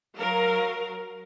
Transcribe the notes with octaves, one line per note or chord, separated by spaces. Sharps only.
F#3 A#4 F5